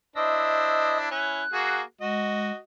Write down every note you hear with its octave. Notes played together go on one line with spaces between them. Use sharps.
D4 E4 C5 D#5 D#6 E6
C#4 E4 F#6
A#3 F#4 G#4
G#3 F#4 D#5